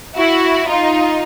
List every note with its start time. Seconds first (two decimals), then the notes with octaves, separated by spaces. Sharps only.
0.16 E4 F#4
0.68 D#4 F4